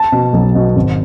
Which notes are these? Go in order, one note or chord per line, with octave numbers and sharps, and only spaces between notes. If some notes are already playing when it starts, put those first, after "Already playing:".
Already playing: A5
B2
B1
B2
G#1